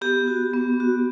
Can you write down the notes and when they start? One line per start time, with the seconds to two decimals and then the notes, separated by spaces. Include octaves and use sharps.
0.01 B3 G4
0.28 F#4
0.54 B3
0.80 F#4